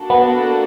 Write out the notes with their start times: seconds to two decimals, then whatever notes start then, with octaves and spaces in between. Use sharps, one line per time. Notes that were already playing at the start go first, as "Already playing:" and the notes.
Already playing: A#3 D4 F#4 A4
0.10 B3